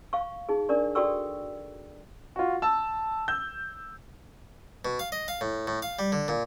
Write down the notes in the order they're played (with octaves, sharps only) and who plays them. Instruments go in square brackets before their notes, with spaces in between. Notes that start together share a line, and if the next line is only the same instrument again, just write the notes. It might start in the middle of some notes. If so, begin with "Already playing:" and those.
[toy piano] F5 C#6
D#4 G#4
D4 A#4 D5 C#6
F#4 A4 D5 G5 C#6 E6
[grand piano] F4 F#4
A5 E6
E6 G6
[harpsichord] B2
F5
D#5
F5
A2
A2
F5
G3
D3
A#2